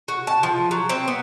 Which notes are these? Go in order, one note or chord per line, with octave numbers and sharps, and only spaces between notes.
F#4
A5
F3
F#3
C4
B3